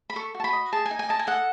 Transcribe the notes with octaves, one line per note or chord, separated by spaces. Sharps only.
B5
A4 C#6
F#4
A5
B5
D#5
G#4 A5
G#5
D#4
G#5
D#5 A5
G#5
A4 F#5